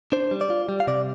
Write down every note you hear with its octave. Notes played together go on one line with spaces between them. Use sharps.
D4 C5
G3
D5
F4
G3
F5
C3 D5